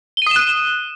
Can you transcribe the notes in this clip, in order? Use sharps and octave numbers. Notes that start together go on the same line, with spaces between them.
D#6 F#6 D#7 E7 G7